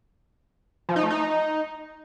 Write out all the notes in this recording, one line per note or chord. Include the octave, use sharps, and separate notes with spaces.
F3
D#4
A3
D#4